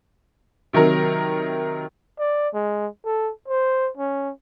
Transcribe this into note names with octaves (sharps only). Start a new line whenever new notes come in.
C3 D#3 F#3 A#4
D5
G#3
A4
C5
C#4